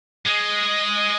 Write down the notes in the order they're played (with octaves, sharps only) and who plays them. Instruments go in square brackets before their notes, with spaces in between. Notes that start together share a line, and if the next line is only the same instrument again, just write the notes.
[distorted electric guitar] G#3 [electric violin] D#5